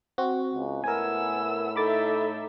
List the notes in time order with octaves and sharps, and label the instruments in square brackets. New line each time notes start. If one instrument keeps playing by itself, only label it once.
[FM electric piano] C4 F#4
[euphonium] C#2
[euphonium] A2 [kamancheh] B3 E6 [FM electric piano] A#4 G#5
[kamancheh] D#4 E5 [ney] A4 [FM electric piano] B5 D6 A6